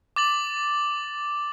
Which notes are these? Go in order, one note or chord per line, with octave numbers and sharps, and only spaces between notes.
D6 A6 F#7